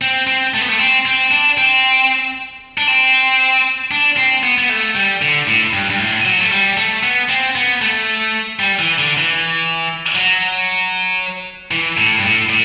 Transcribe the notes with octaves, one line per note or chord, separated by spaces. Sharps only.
C4
C4
A3
B3
A3
C4
C4
D4
C4
D4
C4
D4
C4
B3
B3
A3
G3
D3
A2
G2
G2
A2
F#3
A3
G3
A3
B3
C4
B3
A3
G3
E3
D3
E3
F#3
E3
A2
G2
A2
A2